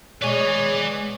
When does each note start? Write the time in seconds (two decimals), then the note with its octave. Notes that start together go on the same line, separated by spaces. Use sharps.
0.22 B2 G#3 B3 G#4 B4 C#5 D5 G#5